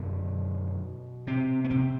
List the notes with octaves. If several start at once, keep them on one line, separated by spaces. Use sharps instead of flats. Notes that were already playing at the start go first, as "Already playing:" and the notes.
Already playing: F#2 B2 D3 B3
C3 C4
B3
C3 C4